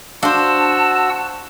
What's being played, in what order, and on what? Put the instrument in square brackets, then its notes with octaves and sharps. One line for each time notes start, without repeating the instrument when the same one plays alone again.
[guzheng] D4 [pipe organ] F#4 F#5 E6 [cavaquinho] C5 F5 [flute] A5